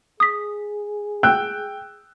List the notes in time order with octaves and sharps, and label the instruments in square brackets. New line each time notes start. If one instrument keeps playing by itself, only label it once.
[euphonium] G#4 [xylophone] D#6 B6
[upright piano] G5 E6 F#6